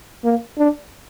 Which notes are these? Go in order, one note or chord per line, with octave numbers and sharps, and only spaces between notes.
A#3
D4